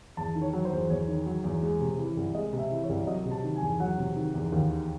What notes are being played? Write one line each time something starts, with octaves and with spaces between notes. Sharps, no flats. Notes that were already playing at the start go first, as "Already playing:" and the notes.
E2 A5
D#3
C#5
F#3
C5
E2
E2 C#5
D#3
F#3
E2
G#3
C3
E3
C2
G#3 D#5
C3
E5
E3
C#5
C2
F#3 D#5
C3
A5
D#3
G#5
E2
F#3 F#5
C3
D#3
E2
D#2
D#3